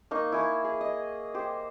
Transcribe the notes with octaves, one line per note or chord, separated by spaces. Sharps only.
A#3 D#4 C#6
E4 G#5 C#6
G#4
D#5
G4 C5